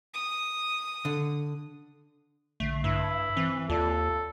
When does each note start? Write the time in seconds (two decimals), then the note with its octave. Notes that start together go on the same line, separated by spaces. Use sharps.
0.14 D#6
1.05 D3
2.60 A#1 D3 A3 C7
2.84 G2 E4
3.04 B5 G#6
3.37 E3 C4
3.69 D#2 F4 A4 D5